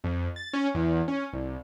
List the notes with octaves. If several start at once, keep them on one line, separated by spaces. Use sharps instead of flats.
F2
A6
C#4
E2
C#4
C2